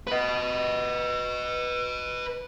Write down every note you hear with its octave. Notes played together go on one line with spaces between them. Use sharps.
B4 D#5